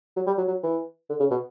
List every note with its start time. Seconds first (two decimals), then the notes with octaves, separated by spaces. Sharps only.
0.17 F#3
0.27 G3
0.38 F#3
0.48 F#3
0.63 E3
1.10 D3
1.20 C#3
1.31 B2